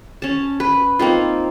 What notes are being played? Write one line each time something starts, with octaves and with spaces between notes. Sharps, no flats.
C#4 A5
B4
A#3 C4 D#4 F4